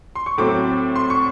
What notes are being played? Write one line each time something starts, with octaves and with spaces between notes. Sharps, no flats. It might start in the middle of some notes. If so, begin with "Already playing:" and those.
C6
C#6
A2 F#3 A3 C4 D6
C6
C#6